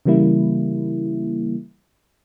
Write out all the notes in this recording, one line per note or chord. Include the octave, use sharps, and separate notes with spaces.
C#3 E3 G3 A#3 E4